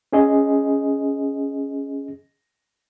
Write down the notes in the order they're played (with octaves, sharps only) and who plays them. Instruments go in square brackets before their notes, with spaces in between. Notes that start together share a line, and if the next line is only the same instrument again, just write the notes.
[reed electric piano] C#4 G#4 D#5